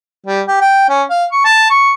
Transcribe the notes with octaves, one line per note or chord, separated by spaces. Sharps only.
G3
G4
G5
C#4
F5
C#6
A5
C#6